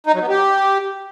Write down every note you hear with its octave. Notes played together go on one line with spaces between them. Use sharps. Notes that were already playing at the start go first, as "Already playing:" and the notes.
D#4
F#3
B3
G4